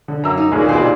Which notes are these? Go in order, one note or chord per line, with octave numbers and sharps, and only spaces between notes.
D3
F#2 A#3 A#5 E6
D#4
D2 A#2 G#3 C#4 G#4
D#2 B2 G4 G#4 C5